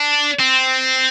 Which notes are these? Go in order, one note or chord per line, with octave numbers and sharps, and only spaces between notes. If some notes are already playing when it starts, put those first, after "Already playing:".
Already playing: D4
C4